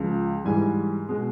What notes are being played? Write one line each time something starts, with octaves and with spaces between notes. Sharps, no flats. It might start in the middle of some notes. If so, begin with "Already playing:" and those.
Already playing: C#2 C#3 F3
G#2 E3 G3 G#5
B2 G#3